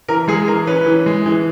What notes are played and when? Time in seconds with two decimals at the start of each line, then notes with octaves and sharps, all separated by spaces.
0.08 E3 A#4
0.28 G#3 G#4
0.48 E3 A#4
0.67 C#4 B4
0.86 E3
1.06 G#3
1.26 E3